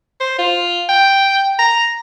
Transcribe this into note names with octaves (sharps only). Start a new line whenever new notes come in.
C5
F4
G5
A#5